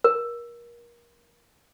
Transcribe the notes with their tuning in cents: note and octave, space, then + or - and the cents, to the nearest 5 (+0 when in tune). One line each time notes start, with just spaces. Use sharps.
A#4 +30